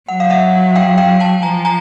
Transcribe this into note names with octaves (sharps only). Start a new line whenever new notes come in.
F#3 F#5
F5
E5 F#5
F5 G5
F5 G5
G5 A5
F3 G#5 A#5
G#5 A#5